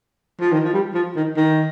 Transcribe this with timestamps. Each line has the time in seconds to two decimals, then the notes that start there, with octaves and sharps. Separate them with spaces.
0.41 F3
0.52 D#3
0.65 F3
0.74 G3
0.95 F3
1.16 D#3
1.37 D#3